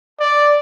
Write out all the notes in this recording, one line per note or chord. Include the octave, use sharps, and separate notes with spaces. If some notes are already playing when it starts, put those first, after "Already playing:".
D5